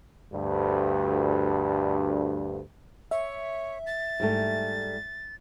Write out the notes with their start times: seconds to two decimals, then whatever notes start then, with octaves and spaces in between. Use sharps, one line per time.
0.32 D2 G2
3.11 C#5 E5
3.86 A6
4.20 G#2 G3 A3